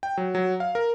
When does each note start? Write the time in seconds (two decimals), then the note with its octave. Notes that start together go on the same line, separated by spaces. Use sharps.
0.03 G5
0.17 F#3
0.35 F#3
0.60 F5
0.75 A#4